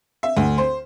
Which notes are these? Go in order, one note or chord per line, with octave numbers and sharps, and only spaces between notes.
E5
D2
C5